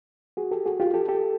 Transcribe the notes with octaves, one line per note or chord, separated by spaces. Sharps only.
F#4 G#4
G4 A4
F#4 G#4
F4 G4
G4 A4
G4 A4